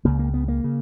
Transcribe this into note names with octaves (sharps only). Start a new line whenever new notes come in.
C#2 C#3 A#3
A#3
B3
A#3
C#3